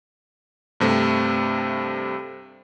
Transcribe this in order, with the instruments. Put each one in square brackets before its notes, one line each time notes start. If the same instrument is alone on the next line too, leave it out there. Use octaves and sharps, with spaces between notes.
[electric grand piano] G2 C3 A3